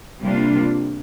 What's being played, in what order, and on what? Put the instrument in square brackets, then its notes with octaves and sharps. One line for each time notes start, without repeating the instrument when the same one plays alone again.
[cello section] C3 G3 A#3 D4 F4